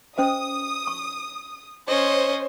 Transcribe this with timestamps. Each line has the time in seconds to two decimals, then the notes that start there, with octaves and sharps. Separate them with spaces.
0.18 C#4 C5 D#5 D#6
0.87 C#6
1.89 C#4 C5 C#5 D#5